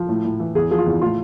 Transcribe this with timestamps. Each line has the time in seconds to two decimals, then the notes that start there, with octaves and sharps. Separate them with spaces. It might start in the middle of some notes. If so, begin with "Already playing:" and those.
Already playing: F3
0.09 A2
0.24 A2
0.40 E3
0.55 E2 G#4
0.71 F3 G#4
0.78 F4
0.86 E2
1.01 A2 F4